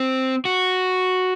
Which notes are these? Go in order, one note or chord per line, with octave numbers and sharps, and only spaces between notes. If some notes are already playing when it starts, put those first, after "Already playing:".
Already playing: C4
F#4